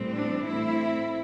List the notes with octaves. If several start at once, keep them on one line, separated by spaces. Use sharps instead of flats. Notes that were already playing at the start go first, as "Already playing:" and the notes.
Already playing: A2 E3 G3 C4
D4
A2 A3 C4 E4